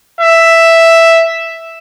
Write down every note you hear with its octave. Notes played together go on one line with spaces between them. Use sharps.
E5